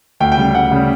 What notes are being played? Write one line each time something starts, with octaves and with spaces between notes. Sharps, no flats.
D2 G5
G5
C#3 G3
D2 F#5
C#3 G3